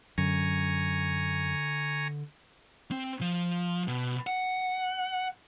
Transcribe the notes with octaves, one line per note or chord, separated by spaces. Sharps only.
F#2 D3 G#5 A#5 C#6
C4
F3
B2
F#5